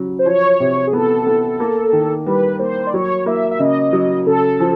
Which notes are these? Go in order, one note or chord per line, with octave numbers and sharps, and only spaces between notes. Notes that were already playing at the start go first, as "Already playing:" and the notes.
Already playing: C#3 F#3
C5
F3 C#5
C3
G#4
B3 A4
B3
A#3
D#3
G3 B4
A#3 C5
D5
F#3 C#5
A#3 E5
E5
C#3 D#5
F#3
C#3 A4
F3